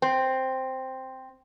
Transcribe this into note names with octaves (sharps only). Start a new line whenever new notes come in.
C4